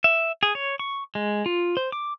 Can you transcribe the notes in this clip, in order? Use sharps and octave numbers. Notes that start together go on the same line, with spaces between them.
E5
G#4
C#5
C#6
G#3
F4
C5
D6